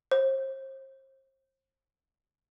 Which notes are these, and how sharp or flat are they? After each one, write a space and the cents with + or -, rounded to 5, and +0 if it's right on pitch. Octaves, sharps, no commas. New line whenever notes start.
C5 +40